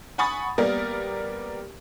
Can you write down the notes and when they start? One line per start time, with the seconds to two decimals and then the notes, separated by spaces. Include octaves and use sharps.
0.18 F#5 G#5 B5 C#6 D#6 A6
0.58 G3 A#3 B3 A#4 D5